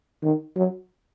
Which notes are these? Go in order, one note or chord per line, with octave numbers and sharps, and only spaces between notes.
D#3
F#3